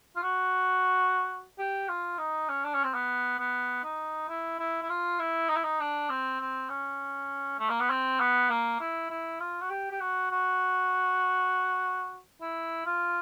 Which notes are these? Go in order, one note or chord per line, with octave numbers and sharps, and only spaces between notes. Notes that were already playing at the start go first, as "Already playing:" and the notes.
F4
F#4
G4
F4
D#4
C#4
D4
C#4
C4
B3
B3
D#4
E4
E4
E4
F4
E4
D#4
E4
D#4
D4
C4
C4
C#4
A3
A#3
B3
C4
B3
A#3
E4
E4
F4
F#4
G4
G4
F#4
F#4
E4
F4